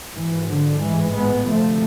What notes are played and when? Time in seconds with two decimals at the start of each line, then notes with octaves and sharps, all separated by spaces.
0.14 G#1 G#2 E3
0.48 D3 F3
0.80 A1 G#2 E3 G#3
1.14 G#3 B3
1.47 D2 C3 F3 A3